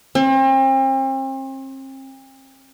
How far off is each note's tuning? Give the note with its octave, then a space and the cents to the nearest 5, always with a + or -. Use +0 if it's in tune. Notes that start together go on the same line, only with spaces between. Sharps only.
C4 +40